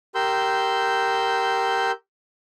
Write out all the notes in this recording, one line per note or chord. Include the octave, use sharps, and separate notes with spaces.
G4 A#4 C6 E6 G6